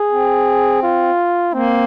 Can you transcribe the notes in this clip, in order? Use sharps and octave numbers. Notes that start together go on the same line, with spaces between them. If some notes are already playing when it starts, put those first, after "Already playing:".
Already playing: G#4
C4
F4
A#3 C4